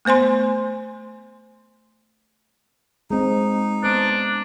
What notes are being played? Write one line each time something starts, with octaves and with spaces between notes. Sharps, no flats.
A3 B3 C5 G#5 C6
G#3 C4 D#4
B3 D4 C5